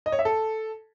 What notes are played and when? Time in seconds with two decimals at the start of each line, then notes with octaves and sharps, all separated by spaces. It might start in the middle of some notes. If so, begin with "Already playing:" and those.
0.06 D#5
0.12 C#5
0.19 E5
0.25 A4